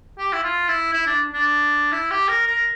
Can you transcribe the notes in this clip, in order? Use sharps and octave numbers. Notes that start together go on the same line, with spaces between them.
G4
E4
F4
E4
E4
D4
D4
E4
G4
A#4
A#4